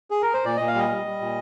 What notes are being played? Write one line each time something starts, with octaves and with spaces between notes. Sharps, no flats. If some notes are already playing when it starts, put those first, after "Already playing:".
G#4
A#4
C5
A#2 D5
A#2 D#5
F5
G3 D#5
G3
G3
A#2